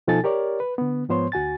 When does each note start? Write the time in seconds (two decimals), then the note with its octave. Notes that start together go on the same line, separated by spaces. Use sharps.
0.08 B2 F3 D#4 A4 G#5 A6
0.24 G4 A#4 C#5 D5
0.60 B4
0.78 D3 B3
1.09 G#2 F3 B3 C5 C#5 C6
1.32 D2 F#4 G#5 A6